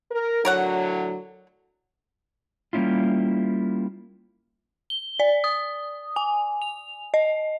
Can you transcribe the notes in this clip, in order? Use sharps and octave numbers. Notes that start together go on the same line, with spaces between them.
A#4
A2 D3 F#3 A#4 C#5 F#5
G3 A#3 B3 C#4 E4 F4
G7
D5
D#6
G#5
F7
D#5